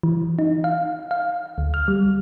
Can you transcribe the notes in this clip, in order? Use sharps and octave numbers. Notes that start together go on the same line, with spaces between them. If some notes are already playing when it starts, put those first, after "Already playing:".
E3
D#4
F5
F5
D2
F6
G3